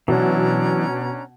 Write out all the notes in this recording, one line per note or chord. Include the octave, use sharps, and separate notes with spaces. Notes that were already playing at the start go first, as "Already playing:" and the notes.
B2 E3 F#3 C#4 D4 A#5